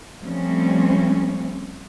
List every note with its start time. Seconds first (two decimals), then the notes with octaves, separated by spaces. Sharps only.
0.21 F3 G3 A3 C4 C#4